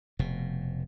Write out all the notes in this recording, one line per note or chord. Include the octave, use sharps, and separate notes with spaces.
F1 B2